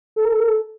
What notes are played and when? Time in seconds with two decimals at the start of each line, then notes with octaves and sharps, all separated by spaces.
0.16 A4
0.25 A#4
0.32 A4
0.40 A#4
0.48 A4